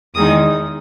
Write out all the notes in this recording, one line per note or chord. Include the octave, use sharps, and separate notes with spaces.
E2 D#3 G#3 D#4 D#6